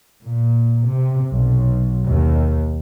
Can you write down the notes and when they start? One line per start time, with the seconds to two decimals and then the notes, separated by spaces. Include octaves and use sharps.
0.24 A#2
0.89 C3
1.33 B1
2.09 D#2